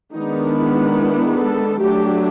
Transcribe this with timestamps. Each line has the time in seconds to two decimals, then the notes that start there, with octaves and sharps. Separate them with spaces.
0.14 D#3 G#3 B3 D4 D#4
0.56 E4
0.98 E4
1.38 A4
1.80 F#3 A3 D4 G4